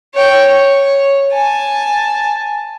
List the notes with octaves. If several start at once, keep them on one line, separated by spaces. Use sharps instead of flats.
C#5 G5
C#5
G#5 A5